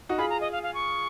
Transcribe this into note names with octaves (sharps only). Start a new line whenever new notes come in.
D#4 F#4
F4 G#4 B5
A#5
D#5
F5
F5
C#6